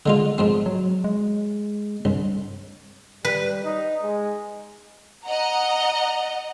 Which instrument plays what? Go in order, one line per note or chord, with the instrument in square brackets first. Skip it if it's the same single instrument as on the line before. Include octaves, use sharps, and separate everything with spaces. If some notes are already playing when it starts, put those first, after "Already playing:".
[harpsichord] D3 G#3 F4
G#2 F3 C4
[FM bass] F#3
G#3
[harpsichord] C2 [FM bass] G2
[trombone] G3 [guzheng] B4
[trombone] D#4
G#3
[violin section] D#5 F#5 A#5